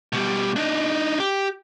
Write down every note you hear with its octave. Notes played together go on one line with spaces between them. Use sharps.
B2 G3
D4 D#4
G4